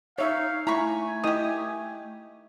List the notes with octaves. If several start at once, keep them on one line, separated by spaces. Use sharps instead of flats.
D#4 C#5 E5 F5 C#6
A3 E4 G#5 A#5 B5 C#6
D#3 E4 G4 D#5 D#6